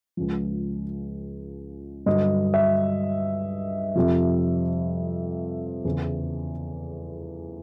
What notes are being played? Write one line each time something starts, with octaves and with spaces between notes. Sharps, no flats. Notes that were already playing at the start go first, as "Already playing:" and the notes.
C#2 C#3 F3
G2 D3 F#3 D#5
E5
F2 C3 F3
E2 C#3 E3